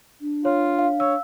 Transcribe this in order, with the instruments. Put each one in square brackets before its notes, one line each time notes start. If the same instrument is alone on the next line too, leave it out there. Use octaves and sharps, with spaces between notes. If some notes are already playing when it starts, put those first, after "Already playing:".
[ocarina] D4
[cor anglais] F4 [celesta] C#5
[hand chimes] F5
[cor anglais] C#5 [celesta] E6